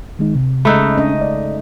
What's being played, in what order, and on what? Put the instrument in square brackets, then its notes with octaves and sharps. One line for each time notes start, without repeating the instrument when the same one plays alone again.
[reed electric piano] D#3 G#3 D#4
C3
[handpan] C#3 G#3 [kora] A3 D#4 [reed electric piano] B5 E6 F#6
[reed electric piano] C#4 D4 [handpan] D#5
[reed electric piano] D5